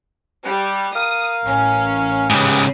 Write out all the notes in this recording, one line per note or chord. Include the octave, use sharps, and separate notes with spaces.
G3 F#6
A#4 F5 D#6
A1 C#4
G#2 C#3 G4 G#4 B4